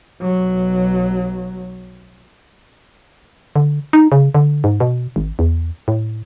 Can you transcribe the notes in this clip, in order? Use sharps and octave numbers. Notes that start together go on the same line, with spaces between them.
B1 F#3
D3
D#4
C#3
D3
G#2
B2
G#1
E2
A2